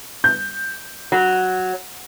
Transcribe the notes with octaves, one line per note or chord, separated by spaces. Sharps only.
G6
F#3